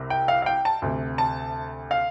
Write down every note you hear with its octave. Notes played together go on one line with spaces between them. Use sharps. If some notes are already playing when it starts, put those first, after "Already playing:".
Already playing: C2 C3
G5
F5
F5
G5
A5
D2 C3
A5
F5